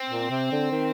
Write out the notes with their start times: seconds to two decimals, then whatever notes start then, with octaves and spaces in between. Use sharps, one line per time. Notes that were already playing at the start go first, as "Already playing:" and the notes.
Already playing: C4
0.10 A#2
0.30 C3
0.52 D3
0.72 D#3